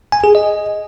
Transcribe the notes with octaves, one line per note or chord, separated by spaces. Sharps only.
G#5
G#4
D#5